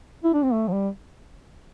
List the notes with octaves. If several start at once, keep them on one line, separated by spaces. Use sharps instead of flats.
E4
D4
C4
A3
F3
G3